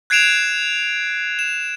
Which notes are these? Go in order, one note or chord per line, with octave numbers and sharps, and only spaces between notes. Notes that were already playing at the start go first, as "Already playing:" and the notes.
F#6 G#6 C7 D7 E7 F7
E7